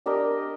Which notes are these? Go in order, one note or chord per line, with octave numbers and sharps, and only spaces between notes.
D4 G4 A#4 D#5